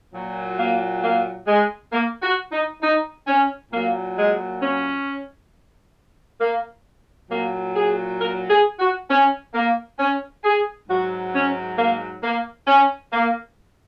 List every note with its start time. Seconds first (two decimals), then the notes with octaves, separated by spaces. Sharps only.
0.14 A#2 F#3
0.58 A#3
1.03 A#3
1.47 G#3
1.93 A#3
2.22 F#4
2.52 D#4
2.82 D#4
3.27 C#4
3.71 A#2 F#3 A#3
4.17 G#3
4.62 C#4
6.41 A#3
7.29 A#2 F#3 A#3
7.75 G#4
8.20 A#4
8.50 G#4
8.79 F#4
9.10 C#4
9.54 A#3
9.99 C#4
10.44 G#4
10.89 G#2 F#3 F#4
11.34 C#4
11.78 A#3
12.23 A#3
12.67 C#4
13.13 A#3